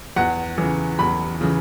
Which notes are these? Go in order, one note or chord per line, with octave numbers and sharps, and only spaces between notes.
E2 F#5
C#3 E3
E2 B5
C#3 E3